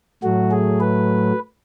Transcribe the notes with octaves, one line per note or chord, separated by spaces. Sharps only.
A2 F#3 A3 F#4
G#4
B4